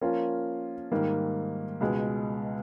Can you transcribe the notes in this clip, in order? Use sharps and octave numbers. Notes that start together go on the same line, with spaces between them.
F3 A#3 C#4 F4 A#4
G#2 D#3 G3 A#3
C#2 B2 G#3